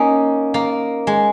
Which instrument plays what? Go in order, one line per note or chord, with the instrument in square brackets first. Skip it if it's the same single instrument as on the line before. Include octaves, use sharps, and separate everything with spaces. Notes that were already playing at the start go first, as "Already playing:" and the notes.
Already playing: [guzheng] A#3 C#4 D#4
A#3
G#3